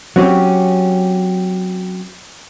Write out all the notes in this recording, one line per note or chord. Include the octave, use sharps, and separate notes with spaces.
F#3 C4 C#4 G4